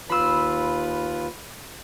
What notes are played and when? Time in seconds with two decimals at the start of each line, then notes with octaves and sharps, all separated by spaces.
0.10 D#2 F4 B4 B5 C6 E6